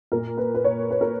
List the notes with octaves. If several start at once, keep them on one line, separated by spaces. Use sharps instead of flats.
A#2 A#4
B4
B4
C#5
B4
A#4